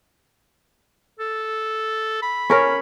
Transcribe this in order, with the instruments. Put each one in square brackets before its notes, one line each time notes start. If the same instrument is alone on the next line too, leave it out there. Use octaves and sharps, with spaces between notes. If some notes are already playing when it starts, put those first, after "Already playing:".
[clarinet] A4
B5
[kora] C#4 A#4 C#5